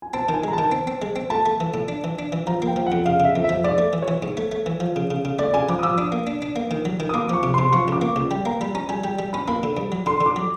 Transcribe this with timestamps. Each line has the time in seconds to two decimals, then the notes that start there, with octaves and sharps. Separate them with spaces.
0.02 G#5
0.14 C4 A5
0.29 D#3
0.34 G#5
0.44 G#3 A#5
0.53 A5
0.58 D#3
0.72 C4
0.87 C4
1.02 G#3
1.16 C4
1.30 A3 A5
1.46 A3
1.60 E3
1.74 A2
1.88 D4
2.04 E3
2.19 D4
2.32 E3
2.47 F3 A#5
2.62 A#3 G5
2.76 F3
2.86 F#5
2.92 F2
3.05 C#3 F5
3.20 C#3 E5
3.36 F2
3.44 E5
3.49 F3
3.64 G#2 D5
3.78 A3
3.93 E3
4.02 C#5
4.08 E3
4.22 G#2
4.37 A3
4.52 A3
4.66 E3
4.80 F3
4.96 C#3
5.10 C#3
5.25 C#3
5.39 A3 D5
5.54 C#3 G#5
5.69 F3 D6
5.79 D#6
5.83 F3 E6
5.98 D4 D#6
6.12 A#3
6.27 D4
6.42 D4
6.56 A#3
6.71 D#3
6.85 F#3
7.00 D#3
7.09 D#6
7.14 A#3 D6
7.29 F3 C#6
7.43 C3
7.54 C3 C6
7.72 F3 C#6
7.88 C#2 D6
8.01 A#3
8.16 C#2
8.31 G3 G5
8.45 A#3 A#5
8.61 G3 B5
8.74 C#4 A#5
8.89 G3 G#5
9.04 G3 G5
9.19 G3
9.33 C#4 B5
9.48 A#3 B5
9.63 D3
9.77 G2
9.92 F#3
10.06 D3 C6
10.21 D3
10.26 D6
10.36 F#3